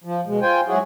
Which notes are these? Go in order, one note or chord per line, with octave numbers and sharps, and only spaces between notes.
F3
B2 G#3
F4 C5 G5 G#5
G#2 F#3 E4 F#4 G#4